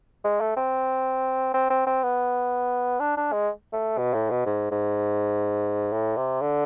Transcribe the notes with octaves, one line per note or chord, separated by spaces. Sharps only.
G#3
A3
C4
C4
C4
C4
B3
D4
D4
G#3
A3
B2
A2
B2
G#2
G#2
A2
C3
D3